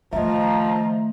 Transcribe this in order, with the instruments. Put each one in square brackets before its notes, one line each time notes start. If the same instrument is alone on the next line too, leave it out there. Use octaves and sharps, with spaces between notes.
[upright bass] D#3 A3 [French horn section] F3 [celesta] D#5 E5 [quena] A#5